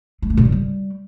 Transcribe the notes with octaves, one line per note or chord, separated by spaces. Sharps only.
G#3
A3
A#2
C#3
G3